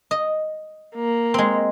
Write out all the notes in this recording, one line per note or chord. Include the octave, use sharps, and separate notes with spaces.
D#5
A#3
G#3 C4